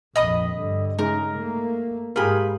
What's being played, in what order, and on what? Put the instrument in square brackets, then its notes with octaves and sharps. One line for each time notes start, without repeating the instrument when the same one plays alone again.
[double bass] A#1 F2 [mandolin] D#5 B5 D#6
[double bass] G2 D3
[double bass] C#3 [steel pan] G#3 D#4 [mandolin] A#4
[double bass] A3 A#3
[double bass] G#2 [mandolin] F4 B5 [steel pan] G4 G#4 A#4